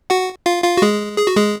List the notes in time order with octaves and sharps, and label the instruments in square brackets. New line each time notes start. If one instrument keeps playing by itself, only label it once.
[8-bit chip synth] F#4 F#5
F4 F5
F4 F5
F#4
G#3 G#4
G#4
F#4
G#3 G#4